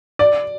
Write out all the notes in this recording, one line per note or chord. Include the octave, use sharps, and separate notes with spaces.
D5